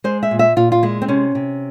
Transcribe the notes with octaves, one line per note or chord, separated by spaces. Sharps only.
G#3 C5
E5
A#2
E5
A#2 F4
F4
G#3 E4
C4
C3 C#4
C3